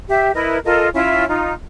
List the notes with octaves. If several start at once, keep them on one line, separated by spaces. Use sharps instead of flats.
G4 E5
E4 A#4 B4 D#5
F4 A4 A#4 D#5
C#4 E4 F4 E5
D#4 F4